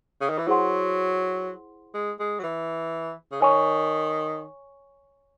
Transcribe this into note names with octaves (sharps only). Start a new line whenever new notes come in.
C#3
D#3
E3
F#3 E4 G#4 C5 F#5 C6
G#3
G#3
F#3
E3
C#3
D#3 C#5 G#5 C#6